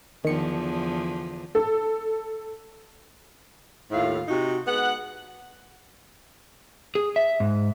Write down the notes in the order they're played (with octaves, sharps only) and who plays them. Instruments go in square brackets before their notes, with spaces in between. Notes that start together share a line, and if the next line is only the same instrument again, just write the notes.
[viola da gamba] E2 D3 F3 [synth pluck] D#3 C#7
[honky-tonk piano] A4
[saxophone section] D#2 A2 E4 F4 F5
C3 D#4 F#4
G#3 B3 F#5
[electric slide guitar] G#4
E5
G#2